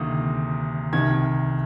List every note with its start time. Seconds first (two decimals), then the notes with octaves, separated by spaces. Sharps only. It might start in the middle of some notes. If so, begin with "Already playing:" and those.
Already playing: D2 C3 D#3 A#3 D#6
0.93 C2 C3 D#3 G#6